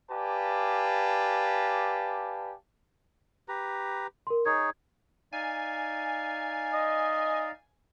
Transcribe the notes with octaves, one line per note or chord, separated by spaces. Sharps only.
G4 B4 D5 F5 G#5 A5
G4 B4 A#5
A#4 C6
D#4 G#4 C#5 G#6
D#4 D5 F5 G#5
D#5